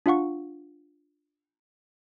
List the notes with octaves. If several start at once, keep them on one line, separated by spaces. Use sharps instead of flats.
D4 F4 F5 F#5 C#6